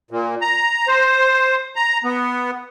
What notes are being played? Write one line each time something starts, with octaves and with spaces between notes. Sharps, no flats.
A#2
A#5
C5
A#5
B3